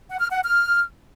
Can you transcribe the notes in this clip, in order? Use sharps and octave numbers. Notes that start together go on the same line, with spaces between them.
F#5
F6
F#5
F6